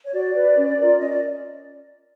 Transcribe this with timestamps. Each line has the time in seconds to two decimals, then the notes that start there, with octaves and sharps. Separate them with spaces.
0.05 C#5
0.14 F#4 D5
0.35 B4
0.56 C#4
0.78 F4 A#4
0.99 C#4 D#5
1.09 D5